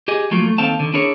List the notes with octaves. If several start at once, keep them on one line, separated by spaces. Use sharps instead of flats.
G4 G#4 D#5 G#5
F3 F#3 A3 A#3 F4
A3
D#2 D#3 C4 A4 F5 A5
D3 D#3
D4 E4 G#4 A#4 C#5